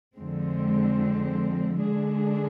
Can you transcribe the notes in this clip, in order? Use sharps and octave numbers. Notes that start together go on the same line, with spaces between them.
F2 D3 G#3 C4
D3 G#3 D4 G#4